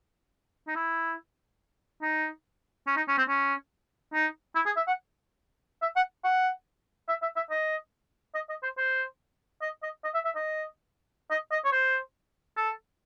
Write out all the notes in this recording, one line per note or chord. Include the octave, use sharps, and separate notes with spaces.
D#4
E4
D#4
C#4
D#4
C#4
C4
C#4
D#4
E4
G#4
E5
F#5
E5
F#5
F#5
E5
E5
E5
D#5
D#5
D#5
C5
C5
D#5
D#5
D#5
E5
E5
D#5
D#5
D#5
C#5
C5
A4